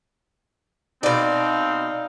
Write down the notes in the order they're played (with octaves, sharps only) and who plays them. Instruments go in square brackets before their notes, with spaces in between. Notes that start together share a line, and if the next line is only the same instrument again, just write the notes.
[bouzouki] B2 D5 [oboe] C4 [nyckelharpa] D#4 F5